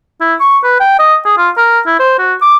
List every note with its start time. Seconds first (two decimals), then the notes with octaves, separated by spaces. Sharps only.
0.21 E4
0.40 C#6
0.64 B4
0.80 G5
0.99 D#5
1.25 G#4
1.38 F4
1.57 A#4
1.87 E4
1.99 C5
2.19 F#4
2.41 D6